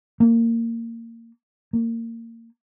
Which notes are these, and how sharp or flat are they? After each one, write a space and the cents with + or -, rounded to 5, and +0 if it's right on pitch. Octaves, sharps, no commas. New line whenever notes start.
A#3 -20
A#3 -25